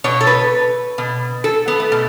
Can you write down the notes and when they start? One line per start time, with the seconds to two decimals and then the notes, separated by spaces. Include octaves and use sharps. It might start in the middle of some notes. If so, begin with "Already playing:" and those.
0.04 B2 C#5
0.21 A4
0.27 B4
0.98 B2
1.44 A4
1.68 B3
1.80 A3
1.92 B2